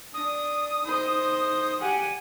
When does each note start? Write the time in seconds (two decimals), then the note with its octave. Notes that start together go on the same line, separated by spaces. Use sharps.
0.14 D4 D#6
0.84 D#4 C5
1.81 G4 F#5 G#5